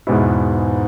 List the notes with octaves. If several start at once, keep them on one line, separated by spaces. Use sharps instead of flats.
E2 G#2 B2 G#3 B3 E4